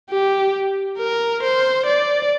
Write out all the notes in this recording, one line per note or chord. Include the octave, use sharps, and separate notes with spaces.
G4
A#4
C5
D5